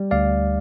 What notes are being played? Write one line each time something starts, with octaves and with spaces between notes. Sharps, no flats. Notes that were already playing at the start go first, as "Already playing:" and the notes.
Already playing: G3
D2 D5 F5